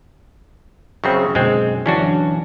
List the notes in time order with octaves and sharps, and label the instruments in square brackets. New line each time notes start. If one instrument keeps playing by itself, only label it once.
[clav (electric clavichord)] F#2 C#3 C4 [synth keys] C#6
[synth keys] F#2 B2 D3 [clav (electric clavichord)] G#3 C4
[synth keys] D3 E3 F#3 [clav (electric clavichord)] C#4 D4 F#4